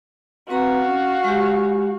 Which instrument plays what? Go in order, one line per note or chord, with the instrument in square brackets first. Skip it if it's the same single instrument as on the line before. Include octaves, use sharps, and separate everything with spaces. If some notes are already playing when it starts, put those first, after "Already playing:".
[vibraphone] C4 B4 A#5 [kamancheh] F#4 F5
[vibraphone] C#4
G#3 G4